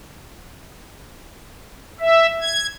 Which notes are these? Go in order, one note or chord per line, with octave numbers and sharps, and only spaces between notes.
E5
G#6